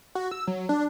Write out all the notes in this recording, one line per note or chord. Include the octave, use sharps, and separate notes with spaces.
F#4
E6
F#3
D4